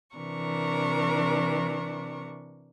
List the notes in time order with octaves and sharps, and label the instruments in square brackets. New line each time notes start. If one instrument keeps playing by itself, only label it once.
[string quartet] C3 E3 D4 A#4 C#6